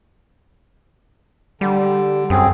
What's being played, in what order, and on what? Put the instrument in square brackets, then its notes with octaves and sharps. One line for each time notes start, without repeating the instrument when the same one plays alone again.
[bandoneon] D3 [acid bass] G3
[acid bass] F#2 [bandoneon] C4 G#4